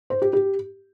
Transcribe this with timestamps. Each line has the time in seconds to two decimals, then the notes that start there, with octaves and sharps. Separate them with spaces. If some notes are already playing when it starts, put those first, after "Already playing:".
0.10 C5
0.22 G4
0.33 G4